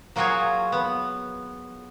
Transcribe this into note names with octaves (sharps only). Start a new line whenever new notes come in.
F#3 A#3 F4 F#4 G#4 C#5
B3